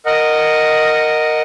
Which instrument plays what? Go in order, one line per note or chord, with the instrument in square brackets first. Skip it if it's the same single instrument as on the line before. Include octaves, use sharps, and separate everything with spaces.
[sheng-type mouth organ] A#4 D#5 F#5